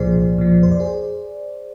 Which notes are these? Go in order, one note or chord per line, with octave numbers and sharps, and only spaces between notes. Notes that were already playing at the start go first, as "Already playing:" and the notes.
Already playing: C2 A#2 F3 G#4 C5 D5
C2
A#2 F3
F2 C5
D5
G#4 C5